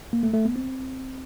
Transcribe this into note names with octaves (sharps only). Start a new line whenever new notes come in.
A#3
A3
A3
B3
C4